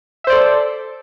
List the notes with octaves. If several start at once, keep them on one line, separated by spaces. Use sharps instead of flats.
A4 C5 D5 E5